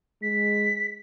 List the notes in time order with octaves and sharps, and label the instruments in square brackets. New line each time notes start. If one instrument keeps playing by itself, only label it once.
[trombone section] G#3 [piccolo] B6